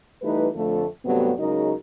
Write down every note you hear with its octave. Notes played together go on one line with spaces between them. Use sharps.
E3 G3 A3 D#4 B4
F2 D3 F3 A3
G2 C3 F#3 A3 B3
C#3 F#3 G#3 D#4 A#4 D#5